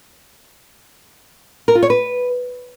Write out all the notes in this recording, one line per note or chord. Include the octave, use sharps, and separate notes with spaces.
A#4
F4
C#5
B4